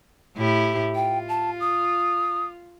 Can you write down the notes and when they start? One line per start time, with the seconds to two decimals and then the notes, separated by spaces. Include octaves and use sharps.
0.36 A2 E4 G4
0.95 F4 G5
1.29 A5
1.60 D#6